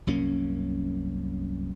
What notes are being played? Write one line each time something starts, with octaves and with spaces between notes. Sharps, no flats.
C2 F#2 A#3 C#4